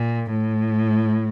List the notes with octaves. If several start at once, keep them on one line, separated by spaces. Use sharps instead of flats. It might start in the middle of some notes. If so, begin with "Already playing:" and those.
Already playing: A#2
A2